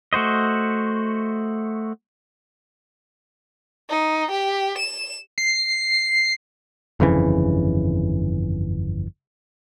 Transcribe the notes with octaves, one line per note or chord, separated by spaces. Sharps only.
A3 F#4 C5 D#5
D#4
G4
E7
C7
G1 F2 C#3 E3